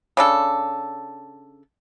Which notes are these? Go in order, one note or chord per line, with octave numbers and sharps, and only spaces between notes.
C#3 D4 A4